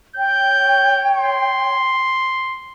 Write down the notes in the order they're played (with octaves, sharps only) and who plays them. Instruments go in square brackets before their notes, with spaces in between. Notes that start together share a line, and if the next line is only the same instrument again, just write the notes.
[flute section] C#5 G5 [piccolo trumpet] G6
[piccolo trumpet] C6